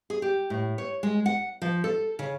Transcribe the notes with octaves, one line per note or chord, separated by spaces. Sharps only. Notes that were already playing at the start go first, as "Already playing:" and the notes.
G#4
G4
A2
C#5
G#3
F#5
F3
A4
C#3